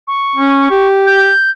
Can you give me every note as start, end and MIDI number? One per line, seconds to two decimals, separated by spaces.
0.08 0.88 85
0.36 0.66 61
0.71 1.29 67
1.07 1.51 91